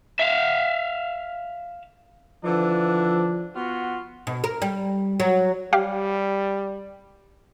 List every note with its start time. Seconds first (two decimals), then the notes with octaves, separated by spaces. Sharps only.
0.20 E5 F5
2.44 D3 E3 F3 D4
3.55 B3 F4 F#4
4.27 B2
4.44 A#4
4.62 G3
5.20 F#3
5.73 G3 G4 F5